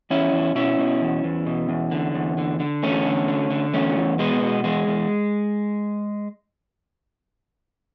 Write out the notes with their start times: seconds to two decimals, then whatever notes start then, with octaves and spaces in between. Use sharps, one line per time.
0.10 E2 C#4 E4
0.32 E2
0.55 B2 C#4 E4
0.78 B2
1.01 E2
1.24 E2
1.47 B2
1.69 E2
1.91 D3
2.15 E2
2.38 D3
2.60 D3
2.83 E2 A3 C#4
3.05 D3
3.28 D3
3.50 D3
3.73 E2 A3 C#4
3.96 E2
4.19 B2 G#3 B3
4.42 B2
4.64 E2 G#3
4.87 E2